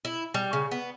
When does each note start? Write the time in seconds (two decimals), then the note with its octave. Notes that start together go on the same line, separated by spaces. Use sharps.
0.05 E4
0.34 G3
0.53 C#3
0.71 B3